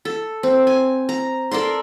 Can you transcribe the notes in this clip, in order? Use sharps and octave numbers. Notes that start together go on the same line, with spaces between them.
A4
C4
G#5
A#5
A4 A#4 D5 C6